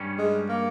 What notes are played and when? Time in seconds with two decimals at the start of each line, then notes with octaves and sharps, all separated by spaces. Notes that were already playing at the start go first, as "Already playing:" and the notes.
Already playing: G2 G3 C#4
0.19 G#3
0.49 A#3